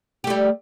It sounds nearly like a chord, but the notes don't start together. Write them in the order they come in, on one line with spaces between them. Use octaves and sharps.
G4 A3 G3